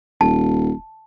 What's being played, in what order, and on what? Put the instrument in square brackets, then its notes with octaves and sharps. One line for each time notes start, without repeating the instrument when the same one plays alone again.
[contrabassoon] D#1 [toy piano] A5